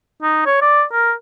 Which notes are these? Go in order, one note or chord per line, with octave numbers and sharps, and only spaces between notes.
D#4
C#5
D5
A#4